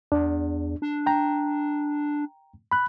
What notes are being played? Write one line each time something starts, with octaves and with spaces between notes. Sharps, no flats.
E2 D4
D4
G5 A#5
B5 F#6